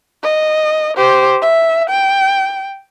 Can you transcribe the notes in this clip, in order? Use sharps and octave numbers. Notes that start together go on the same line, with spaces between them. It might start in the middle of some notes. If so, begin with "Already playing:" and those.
D#5
G4 C5
E5
G5